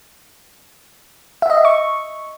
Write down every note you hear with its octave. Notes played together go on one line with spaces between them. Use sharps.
E5
D#5
E5
C#6